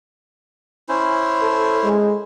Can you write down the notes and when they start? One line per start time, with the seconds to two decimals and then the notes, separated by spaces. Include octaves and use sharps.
0.89 C#4 E4 C5
1.42 A4
1.83 G#3